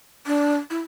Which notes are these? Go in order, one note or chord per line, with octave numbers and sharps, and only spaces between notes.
D4
E4